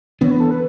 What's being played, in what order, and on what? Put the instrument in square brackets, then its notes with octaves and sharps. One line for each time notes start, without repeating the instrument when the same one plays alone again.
[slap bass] E3 B3 D4 [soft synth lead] C#5
[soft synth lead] B4
A4
B4